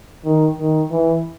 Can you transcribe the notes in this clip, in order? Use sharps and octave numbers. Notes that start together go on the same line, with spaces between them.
D#3
D#3
E3